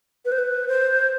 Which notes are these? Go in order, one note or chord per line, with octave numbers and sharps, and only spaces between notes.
B4
C5
B4
C5